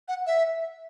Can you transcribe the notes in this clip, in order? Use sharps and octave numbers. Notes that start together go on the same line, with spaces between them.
F#5
E5